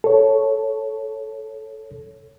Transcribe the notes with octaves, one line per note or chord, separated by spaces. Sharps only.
A4 C#5